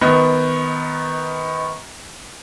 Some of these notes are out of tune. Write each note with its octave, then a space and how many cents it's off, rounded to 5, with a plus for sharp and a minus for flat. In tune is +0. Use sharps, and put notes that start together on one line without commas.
D#3 +15 B3 +20 D#5 +35